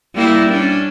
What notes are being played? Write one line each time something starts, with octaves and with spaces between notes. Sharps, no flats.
G3 A#3 E4
C#4 D4